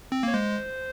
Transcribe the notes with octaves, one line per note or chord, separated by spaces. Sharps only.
C4
A#3 C#5
G#3 C5